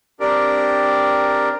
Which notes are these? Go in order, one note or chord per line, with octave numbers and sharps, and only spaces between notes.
C4 D4 G4 A#4 D5